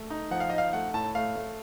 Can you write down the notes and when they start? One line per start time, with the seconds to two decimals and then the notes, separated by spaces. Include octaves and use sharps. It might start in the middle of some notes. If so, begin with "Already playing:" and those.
Already playing: A3
0.10 D#4
0.31 F3 F#5
0.40 F5
0.50 D#4 D#5
0.58 F5
0.73 A3 F#5
0.94 A2 A5
1.15 A3 F5
1.35 A3